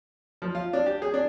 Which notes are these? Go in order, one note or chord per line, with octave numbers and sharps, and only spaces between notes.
F3
F4
D4
G4
G#4
D4